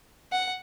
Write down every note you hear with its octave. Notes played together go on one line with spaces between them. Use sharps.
F#5